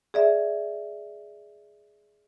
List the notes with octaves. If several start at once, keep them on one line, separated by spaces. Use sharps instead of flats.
G#4 D5 E5